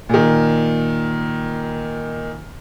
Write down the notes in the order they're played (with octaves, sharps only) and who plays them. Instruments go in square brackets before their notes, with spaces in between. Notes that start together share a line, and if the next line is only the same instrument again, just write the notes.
[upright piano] A#2 D#3